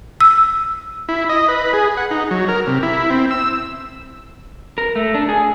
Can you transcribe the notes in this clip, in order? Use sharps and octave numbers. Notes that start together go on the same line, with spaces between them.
E6
E4
D#5
B4
G#4
F#5
D#4
F#3
A#4
C3
E4
C4
E6
A#4
A3
D4
G#4